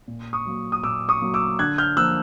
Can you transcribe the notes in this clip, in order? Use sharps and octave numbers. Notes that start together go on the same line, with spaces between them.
A#2
C#6 D#6
F#3 A#3
D#6
A#2 D6 E6
C#6 D#6
F#3 A#3
D6 E6
D3 F#6 G#6
F6 G6
F3 A#3 E6 F#6